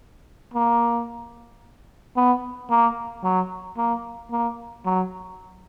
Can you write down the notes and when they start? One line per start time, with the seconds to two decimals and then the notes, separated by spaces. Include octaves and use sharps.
0.54 A#3
2.16 B3
2.70 A#3
3.24 F#3
3.77 A#3
4.31 A#3
4.86 F#3